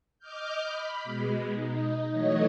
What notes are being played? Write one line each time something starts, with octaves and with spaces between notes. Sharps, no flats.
D#5 D6 F6 G6
B5
B2 G#3
D#4
E3 F#3 A3 C#5 D#5